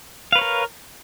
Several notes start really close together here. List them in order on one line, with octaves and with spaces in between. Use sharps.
F5 B4 C#5 A#4